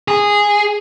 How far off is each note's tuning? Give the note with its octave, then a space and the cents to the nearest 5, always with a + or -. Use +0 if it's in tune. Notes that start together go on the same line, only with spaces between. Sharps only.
G#4 -10